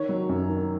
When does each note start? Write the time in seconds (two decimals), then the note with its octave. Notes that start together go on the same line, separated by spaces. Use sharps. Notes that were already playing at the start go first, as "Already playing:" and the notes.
Already playing: D#3 C#5
0.09 F#3
0.29 F#2
0.49 D#3